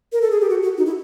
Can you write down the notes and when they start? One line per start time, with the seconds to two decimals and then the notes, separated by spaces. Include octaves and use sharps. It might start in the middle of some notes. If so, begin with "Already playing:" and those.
0.12 A#4
0.22 A4
0.31 G#4
0.41 G4
0.50 F#4
0.63 F#4
0.78 D#4
0.86 E4